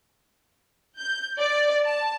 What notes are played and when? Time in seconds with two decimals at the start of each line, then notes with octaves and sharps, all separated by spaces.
0.99 G6
1.39 D5
1.86 A5